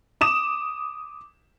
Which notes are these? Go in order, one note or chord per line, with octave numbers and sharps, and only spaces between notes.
D6 D#6 E7